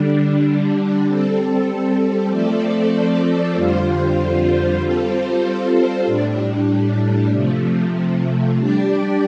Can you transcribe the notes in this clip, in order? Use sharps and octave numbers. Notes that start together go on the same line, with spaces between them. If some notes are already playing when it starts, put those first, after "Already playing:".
Already playing: D3 G3 D4
G3 C4 A4
F3 A3 C4 A4 D5
F2 D3 G3 F4 C5
G3 C4 F4 A4 C5
A2 G3 D4
C3 F3 A3
G3 D4 G4 D5